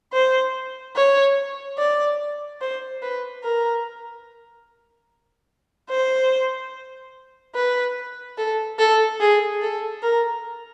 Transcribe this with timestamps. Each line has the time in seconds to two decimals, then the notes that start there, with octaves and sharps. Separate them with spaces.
0.13 C5
0.96 C#5
1.78 D5
2.61 C5
3.02 B4
3.44 A#4
5.90 C5
7.56 B4
8.38 A4
8.79 A4
9.20 G#4
9.62 A4
10.03 A#4